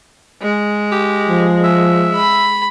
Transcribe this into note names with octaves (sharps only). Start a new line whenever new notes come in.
G#3
G4
F3
E5
B5